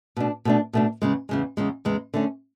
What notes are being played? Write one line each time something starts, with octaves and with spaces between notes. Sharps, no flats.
B2 A3 D4
B2 A3 D4
B2 A3 D4
E2 C#3 G#3
E2 C#3 G#3
E2 C#3 G#3
E2 C#3 G#3
D3 A3 C#4